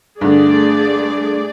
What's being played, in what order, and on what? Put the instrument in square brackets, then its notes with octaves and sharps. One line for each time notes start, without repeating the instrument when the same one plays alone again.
[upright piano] G2 D3 [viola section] A3 G#4 D5